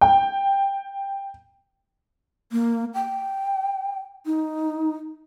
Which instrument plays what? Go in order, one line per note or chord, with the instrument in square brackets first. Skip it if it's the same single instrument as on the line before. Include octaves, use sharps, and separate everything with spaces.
[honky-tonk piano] G5
[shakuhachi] A#3
G5
D#4